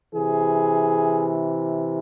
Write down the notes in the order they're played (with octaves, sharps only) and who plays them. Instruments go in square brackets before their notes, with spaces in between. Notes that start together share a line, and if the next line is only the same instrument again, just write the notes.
[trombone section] C3 E3 G#4